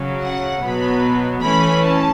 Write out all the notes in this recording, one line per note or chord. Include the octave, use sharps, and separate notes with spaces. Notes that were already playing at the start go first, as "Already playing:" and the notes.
Already playing: C#3 F#3 C#4
F#5
B2 F#3 B3 B5
E3 A3 C#4 B5
A5